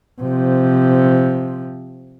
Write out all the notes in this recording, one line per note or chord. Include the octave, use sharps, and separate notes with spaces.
C3 F3